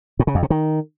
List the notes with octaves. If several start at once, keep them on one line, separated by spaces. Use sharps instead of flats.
A2
C#3
F2
C3
D#3